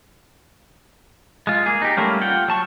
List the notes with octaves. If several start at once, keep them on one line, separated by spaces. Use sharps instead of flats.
G#3 F4
A#3 G#4
D#4 G4
G3 A3 A#3 C#4
F4 F#5 G5
F#3 A5 C#6